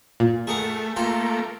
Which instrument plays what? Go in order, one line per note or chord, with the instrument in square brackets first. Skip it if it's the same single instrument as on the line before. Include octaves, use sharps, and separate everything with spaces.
[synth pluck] A#2
[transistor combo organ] A3 [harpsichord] G#4 A#4 F#5
[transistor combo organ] A3 A#3 [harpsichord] F4 A4 G5